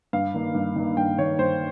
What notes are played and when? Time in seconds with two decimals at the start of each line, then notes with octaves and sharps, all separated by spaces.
0.13 G2 F5
0.34 D#3 A#3
0.55 G2
0.76 D#3 A#3
0.97 G2 G5
1.18 D#3 A#3 C#5
1.39 G2 C5